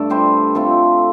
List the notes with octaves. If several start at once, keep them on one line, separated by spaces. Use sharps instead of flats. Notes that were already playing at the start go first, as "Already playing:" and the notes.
Already playing: G2 A3 D4 A4 D5
C3 G3 C4 G4 C5
C3 A3 C4 F4 A4